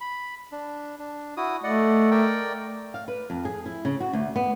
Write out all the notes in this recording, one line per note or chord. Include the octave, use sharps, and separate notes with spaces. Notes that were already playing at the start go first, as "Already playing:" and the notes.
B5
D4
D4
E4 F#4 D#6
A3 D5 D#5 F#5
A#4 D5 G5
F5
B4
F2
G#4
E4
C#3
F#4
D2
B3